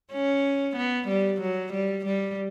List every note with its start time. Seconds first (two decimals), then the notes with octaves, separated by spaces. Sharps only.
0.13 C#4
0.77 B3
1.09 G3
1.41 F#3
1.73 G3
2.06 G3